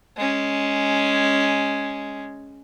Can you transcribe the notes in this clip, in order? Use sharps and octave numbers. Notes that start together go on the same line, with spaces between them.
G#3 C#4